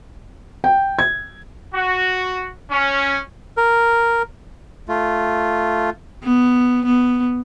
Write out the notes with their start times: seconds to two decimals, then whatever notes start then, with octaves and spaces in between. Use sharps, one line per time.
0.64 G5
0.99 G#6
1.74 F#4
2.71 C#4
3.57 A#4
4.88 A3 F4
6.23 B3
6.85 B3